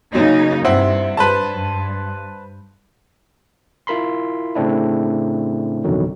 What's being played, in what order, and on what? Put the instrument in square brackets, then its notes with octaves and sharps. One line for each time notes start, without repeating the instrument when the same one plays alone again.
[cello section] C#3 A#3 D#4 [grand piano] F#3
[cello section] G2 C3 [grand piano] C4 E4 F#5
[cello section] G2 [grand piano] B4 C5 A5
[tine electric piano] E4 F4 A#4 B5 C6
A2 C#3 A3 C4 D4 E4
A1 F2 B2 D3 D#3 F#3